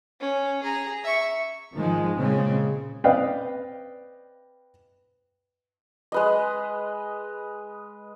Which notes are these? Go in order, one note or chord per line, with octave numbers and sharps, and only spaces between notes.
C#4
G#4 A#5
E5 C#6
G#2 D#3 F3 G#3
A#2 C#3 G#3 C4
C4 B4 D5 D#5 F5 G5
G#3 B4 D#5